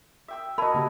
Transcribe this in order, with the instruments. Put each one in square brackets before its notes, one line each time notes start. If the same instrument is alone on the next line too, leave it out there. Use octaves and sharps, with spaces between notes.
[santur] E5 G5 E6
[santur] E4 F#4 [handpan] A#4 D#5 [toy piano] A5 B5
[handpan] C#3 A#3 G4